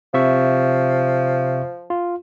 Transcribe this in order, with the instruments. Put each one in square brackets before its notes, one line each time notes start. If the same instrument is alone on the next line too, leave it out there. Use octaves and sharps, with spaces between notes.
[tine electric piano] C3 E5 C#6 [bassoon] F3
[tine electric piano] F4